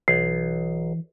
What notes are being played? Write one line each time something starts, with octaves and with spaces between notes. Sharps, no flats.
B1 E3 C7